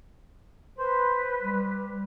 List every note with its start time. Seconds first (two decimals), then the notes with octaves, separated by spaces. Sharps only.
0.78 B4 C5
1.42 G3